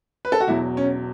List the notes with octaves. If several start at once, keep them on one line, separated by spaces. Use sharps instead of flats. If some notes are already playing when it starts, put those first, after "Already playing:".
B4
A4
F#4
E1 E2 B2 F#3 E4
C#4